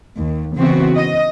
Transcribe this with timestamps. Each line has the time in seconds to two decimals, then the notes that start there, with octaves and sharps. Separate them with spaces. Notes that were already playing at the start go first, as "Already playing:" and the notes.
0.18 D#2
0.56 C#3 E3 B3 C4 F#4
0.96 D#5